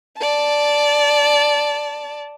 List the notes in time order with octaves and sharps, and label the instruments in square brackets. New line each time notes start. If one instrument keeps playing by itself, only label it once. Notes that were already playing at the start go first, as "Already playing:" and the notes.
[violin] D5 A5